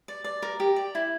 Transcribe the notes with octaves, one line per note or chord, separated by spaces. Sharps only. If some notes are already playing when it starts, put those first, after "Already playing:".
D5
D5
A#4
G4
D5
E4